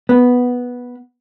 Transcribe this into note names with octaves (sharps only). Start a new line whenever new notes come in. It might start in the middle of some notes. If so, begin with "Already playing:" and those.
B3